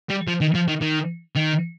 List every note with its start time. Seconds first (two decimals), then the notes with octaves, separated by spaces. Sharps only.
0.10 G3
0.28 F3
0.41 D#3
0.55 F3
0.68 D#3
0.82 D#3
1.35 D#3